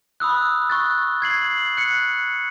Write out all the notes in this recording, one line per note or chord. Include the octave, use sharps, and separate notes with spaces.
B5 D#6 E6 F#6
C#6 F#6 A6
G#6 C7 F#7
F#6 C#7